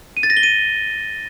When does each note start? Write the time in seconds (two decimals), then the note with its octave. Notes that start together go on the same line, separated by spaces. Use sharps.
0.17 D#7
0.23 A6
0.30 A#6
0.37 G7
0.43 D#7